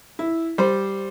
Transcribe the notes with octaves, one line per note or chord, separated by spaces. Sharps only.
E4
G3 C5